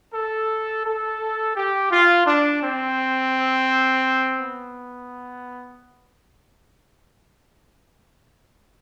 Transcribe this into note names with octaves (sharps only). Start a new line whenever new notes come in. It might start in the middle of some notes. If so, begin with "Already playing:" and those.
A4
A4
G4
F4
D4
C4
B3